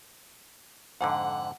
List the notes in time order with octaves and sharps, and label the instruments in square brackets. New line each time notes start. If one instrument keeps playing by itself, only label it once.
[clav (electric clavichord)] F2 G#2 D3 [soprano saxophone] F#5